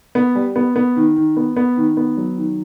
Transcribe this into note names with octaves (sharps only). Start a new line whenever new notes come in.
B3
G3
B3
B3
D#3
D#3
B3
B3
D#3
B3
F#3
D#3